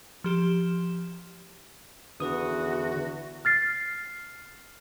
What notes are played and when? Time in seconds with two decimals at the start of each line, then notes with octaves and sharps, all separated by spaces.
0.24 F3 G4 E7
2.20 E2 D3 F#4 B4 D#6
3.45 F6 A6 C7